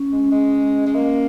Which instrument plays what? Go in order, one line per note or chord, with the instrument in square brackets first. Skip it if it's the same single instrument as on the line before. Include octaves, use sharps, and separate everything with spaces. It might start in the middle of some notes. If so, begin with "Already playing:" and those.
Already playing: [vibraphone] C#4
[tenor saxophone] G#3
G#3
G#3
A#3